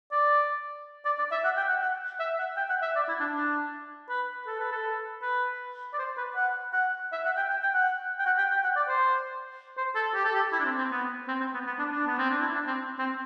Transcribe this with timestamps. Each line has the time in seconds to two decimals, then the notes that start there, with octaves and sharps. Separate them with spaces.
0.12 D5
1.05 D5
1.19 D5
1.32 E5
1.44 F#5
1.57 G5
1.69 F#5
1.82 F#5
2.19 E5
2.39 F#5
2.57 G5
2.69 F#5
2.82 E5
2.96 D5
3.08 E4
3.20 D4
3.34 D4
4.09 B4
4.47 A4
4.59 B4
4.72 A4
5.22 B4
5.93 D5
5.98 C5
6.17 B4
6.36 F#5
6.73 F#5
7.12 E5
7.25 F#5
7.37 G5
7.50 G5
7.63 G5
7.74 F#5
8.19 G5
8.26 F#5
8.38 G5
8.50 G5
8.64 F#5
8.76 D5
8.88 C5
9.77 C5
9.95 A4
10.15 G4
10.25 A4
10.35 G4
10.52 E4
10.60 D4
10.65 C4
10.78 C4
10.91 B3
11.28 C4
11.40 C4
11.54 B3
11.67 B3
11.79 D4
11.92 D4
12.07 B3
12.18 C4
12.30 D4
12.41 E4
12.55 D4
12.67 C4
12.99 C4